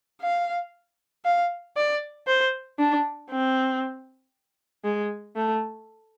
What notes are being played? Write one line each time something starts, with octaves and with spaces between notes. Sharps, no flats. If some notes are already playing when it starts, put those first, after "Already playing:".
F5
F5
D5
C5
D4
C4
G#3
A3